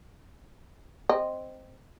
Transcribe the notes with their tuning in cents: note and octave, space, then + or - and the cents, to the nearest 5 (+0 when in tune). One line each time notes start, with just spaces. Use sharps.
C4 +0 D#5 -5